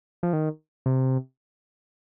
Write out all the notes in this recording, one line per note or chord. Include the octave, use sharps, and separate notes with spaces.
F3
D#3
C3